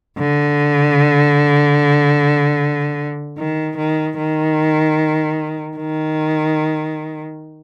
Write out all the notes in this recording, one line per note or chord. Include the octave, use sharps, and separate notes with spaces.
D3
D#3
D#3
D#3
D#3